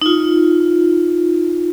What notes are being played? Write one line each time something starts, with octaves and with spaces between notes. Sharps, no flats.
D#4 F4